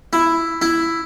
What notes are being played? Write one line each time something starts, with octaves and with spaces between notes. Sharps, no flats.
E4
E4